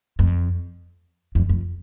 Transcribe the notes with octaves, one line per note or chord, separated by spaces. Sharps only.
F2
F2
F2